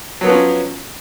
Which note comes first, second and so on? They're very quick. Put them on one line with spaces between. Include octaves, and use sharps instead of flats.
F#3 B3 F3 C#4